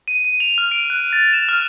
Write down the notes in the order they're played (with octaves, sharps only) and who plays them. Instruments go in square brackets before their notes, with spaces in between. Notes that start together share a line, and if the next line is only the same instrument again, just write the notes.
[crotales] D#7
D#7
F7
F6
D7
F#6
A6
E7
F6